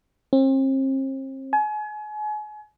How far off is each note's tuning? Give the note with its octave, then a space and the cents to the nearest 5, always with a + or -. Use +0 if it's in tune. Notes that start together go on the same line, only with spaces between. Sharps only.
C4 +40
G#5 +35